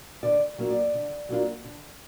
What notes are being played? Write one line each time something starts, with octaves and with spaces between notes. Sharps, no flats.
D3 D5
F#3 A#3 D4 F4
D5
D3
F#3 A#3 D4 F4
D3